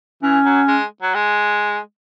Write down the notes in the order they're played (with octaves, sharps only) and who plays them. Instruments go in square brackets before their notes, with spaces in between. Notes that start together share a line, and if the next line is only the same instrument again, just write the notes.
[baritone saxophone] E3 [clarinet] C#4
[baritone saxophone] F#3
G#3
F#3
G#3